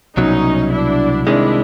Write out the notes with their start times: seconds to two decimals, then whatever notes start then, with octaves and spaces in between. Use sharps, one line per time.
0.17 C2 B2 F#3 C#4 D#4
0.72 D4 E4
1.26 C2 C3 D#3 G#3 D4 E4